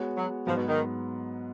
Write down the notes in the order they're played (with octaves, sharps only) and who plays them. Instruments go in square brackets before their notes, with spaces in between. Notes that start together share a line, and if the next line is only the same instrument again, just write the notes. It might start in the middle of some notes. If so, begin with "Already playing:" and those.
Already playing: [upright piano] G#3 B3 F#4 C#5
[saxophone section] F#3
[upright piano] G#2 F#3 B3 [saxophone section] F3
[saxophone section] B2
D#3